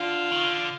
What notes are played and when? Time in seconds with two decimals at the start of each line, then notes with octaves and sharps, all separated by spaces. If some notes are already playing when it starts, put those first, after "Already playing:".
Already playing: D3 F4
0.31 D#3
0.43 D3